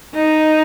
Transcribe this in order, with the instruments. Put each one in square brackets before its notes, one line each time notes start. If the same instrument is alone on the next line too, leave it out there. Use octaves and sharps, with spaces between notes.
[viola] D#4